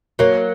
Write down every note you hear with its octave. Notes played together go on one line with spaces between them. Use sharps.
F#3 A#3 C#5